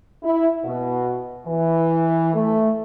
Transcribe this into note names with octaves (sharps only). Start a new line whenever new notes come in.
E4
B2
E3
A3